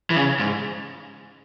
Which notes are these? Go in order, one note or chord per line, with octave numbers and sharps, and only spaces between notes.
E3
C#3
G#2